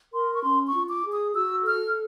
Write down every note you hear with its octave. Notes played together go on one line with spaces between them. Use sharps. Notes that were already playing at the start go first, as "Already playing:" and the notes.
A#4 C6
C#6
C#4 C6
C#6
F4
D6
G#4
D#6
F#4 E6
A4 F6